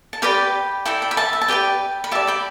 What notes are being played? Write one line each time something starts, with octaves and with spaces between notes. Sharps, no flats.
A5
G4 B4 D5 G5 B5
E4 A4 D5 G5
G5
B5
E5 A5
E5
A5
G4 B4 D5 G5
B5
G4 D5 E5 A5
G5 B5